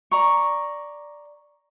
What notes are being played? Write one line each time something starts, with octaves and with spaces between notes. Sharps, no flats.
D5 A#5 C#6